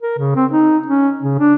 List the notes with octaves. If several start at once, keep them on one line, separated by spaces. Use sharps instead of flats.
A#4
C#3
C4
D#4
C#4
C#3
D4